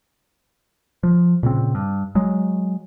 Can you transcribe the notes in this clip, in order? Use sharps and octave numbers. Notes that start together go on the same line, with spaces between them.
F3
A#2 C#3 C4
G2
F#3 G#3